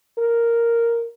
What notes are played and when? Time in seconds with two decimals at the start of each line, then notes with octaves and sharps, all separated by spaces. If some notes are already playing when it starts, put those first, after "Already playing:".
0.19 A#4